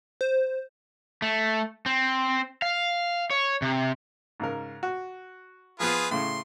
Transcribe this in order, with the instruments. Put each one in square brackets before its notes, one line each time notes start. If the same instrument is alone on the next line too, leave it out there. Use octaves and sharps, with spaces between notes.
[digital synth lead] C5
[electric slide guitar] A3
C4
F5
C#5
C3
[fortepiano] G#2 C#3 A#4
F#4
[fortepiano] F3 B3 [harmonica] F4 G#4 B4
[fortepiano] A2 C#3 [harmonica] C6